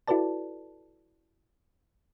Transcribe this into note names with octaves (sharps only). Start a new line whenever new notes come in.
E4 F#4 A4 B4 D5 A5